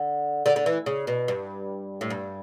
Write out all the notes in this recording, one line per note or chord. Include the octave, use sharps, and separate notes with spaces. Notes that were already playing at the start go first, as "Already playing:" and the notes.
Already playing: D3
D3
D3
E3
C#3
B2
G2
A2
G2